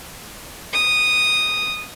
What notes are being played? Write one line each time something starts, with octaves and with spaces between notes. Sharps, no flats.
D#6